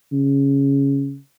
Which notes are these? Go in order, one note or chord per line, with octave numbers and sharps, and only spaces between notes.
C#3